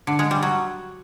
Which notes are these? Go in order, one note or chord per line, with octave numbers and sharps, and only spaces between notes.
D3
G#3
G3
F#3